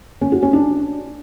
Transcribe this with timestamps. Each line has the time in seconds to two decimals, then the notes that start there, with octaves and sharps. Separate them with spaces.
0.21 C#4
0.32 F#4
0.43 C#4
0.53 D4